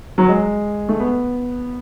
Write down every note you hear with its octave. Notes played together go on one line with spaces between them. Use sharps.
F#3
G#3
A3
B3